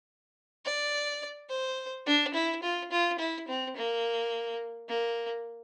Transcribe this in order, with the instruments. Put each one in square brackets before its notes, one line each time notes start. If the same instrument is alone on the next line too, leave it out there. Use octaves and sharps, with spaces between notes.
[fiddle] D5
C5
D4
E4
F4
F4
E4
C4
A#3
A#3